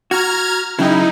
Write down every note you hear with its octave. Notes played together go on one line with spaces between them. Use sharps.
F#4 A#5 F6 G#6
C#3 F#3 D#4 E4 G5